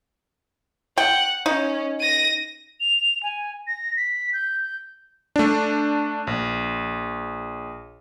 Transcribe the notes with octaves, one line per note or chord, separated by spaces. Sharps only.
F#5 G5
C#4 D#4
A#6 D#7
F7
G#5
A#6
B6
G6
A3 D4
A#1